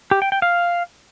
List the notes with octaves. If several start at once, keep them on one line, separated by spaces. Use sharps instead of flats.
G4
G5
G5
F5